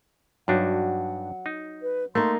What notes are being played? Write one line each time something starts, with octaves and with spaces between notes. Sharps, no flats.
G2 F#3 D4 D#4 F#5
D#4
B4
A3 A#3 D#4 C6